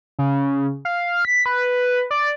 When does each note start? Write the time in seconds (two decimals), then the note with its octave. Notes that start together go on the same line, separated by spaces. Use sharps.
0.19 C#3
0.85 F5
1.25 B6
1.46 B4
2.11 D5